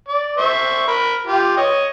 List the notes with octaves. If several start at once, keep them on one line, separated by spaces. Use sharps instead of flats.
D5
C5 E5 C#6
A#4 B5
F4 G4
C#5 D#5